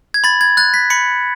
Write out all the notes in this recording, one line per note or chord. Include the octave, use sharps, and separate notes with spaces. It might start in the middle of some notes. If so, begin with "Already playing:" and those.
G#6
B5 A6
G#6
F#6 A6
B6
B5 C#7